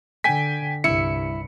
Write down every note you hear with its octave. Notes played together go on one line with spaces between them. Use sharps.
D3 G5 G#5 B6
C2 G2 E4 C#7